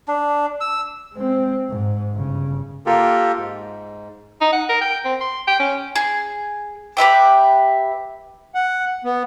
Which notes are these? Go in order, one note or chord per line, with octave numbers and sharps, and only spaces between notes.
D4
E6
G#3 C4
G#2
G1 C#3
A#3 F4 G4 A4 A#4
G#2
D#4
F#5
A#4
G5
C4
C6
G5
C#4
G#4
G4 B4 E5 G5
F#5
B3